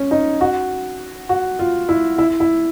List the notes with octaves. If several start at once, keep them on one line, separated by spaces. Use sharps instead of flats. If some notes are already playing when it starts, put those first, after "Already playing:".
Already playing: C#4
D#4
F#4
F#4
F4
E4
E4
E4